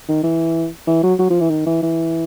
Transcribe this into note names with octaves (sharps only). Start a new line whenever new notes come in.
D#3
E3
E3
F#3
F#3
F3
E3
D#3
E3
E3